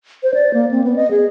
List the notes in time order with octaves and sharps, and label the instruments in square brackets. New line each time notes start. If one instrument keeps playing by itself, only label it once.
[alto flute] C5
D5
A#3
C4
B3
D#5
G#4